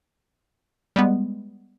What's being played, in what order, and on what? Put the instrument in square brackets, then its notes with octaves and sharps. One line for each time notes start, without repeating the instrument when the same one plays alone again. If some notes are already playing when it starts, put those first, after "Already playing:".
[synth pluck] G3 G#3 B3